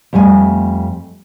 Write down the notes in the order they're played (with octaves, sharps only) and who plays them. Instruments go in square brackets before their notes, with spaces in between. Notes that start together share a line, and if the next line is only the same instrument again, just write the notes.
[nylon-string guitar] F2 G3 A3 G#5